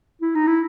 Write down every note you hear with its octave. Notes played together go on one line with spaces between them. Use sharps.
E4
D#4
E4